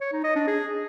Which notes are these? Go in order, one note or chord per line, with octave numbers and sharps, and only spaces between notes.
C#5
D#4
D#5
D4
G#4